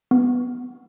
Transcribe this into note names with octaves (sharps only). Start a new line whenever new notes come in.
B3